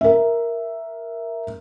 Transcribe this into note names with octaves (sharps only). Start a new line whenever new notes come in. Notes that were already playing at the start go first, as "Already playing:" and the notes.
A#4 E5